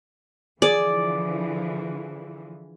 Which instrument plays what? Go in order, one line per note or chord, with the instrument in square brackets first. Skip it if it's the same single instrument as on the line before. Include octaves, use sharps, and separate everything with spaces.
[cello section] D3 E3 F3 [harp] G#4 [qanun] D5